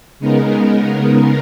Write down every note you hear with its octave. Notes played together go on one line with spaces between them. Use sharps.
C#3 G#3 B3 D#4 A#4